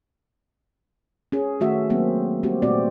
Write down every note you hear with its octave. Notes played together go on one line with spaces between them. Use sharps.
C#4 G#4
D#3 A3 F#4 E5
F#3 G#3 A#3 C4
G3 A#3 C4 F#4 G4
A#2 A3 B3 C4 F#4 D5